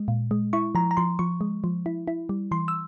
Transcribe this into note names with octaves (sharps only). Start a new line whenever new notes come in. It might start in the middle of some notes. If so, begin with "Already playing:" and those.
Already playing: G#3
A#2
G#3
E4 C#6
F3 A#5
A#5
F3 C6
F3 C#6
G#3
F3
E4
E4
G3
E3 C6
E6